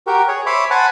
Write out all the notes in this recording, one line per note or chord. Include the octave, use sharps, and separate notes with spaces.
F#4 G4 A#4
G#4 C#5
C5 C#5 E5 B5 C6 D6
C5 F#5 G#5 A5 B5